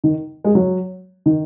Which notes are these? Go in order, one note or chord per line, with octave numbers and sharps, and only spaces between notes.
D#3
G#3
F#3
D#3